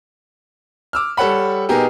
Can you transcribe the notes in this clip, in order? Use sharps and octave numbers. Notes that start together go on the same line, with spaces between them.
D6 E6 F6
G3 A4 C#5 F#5 B5
B2 B3 D#4 G4 G#4 A#4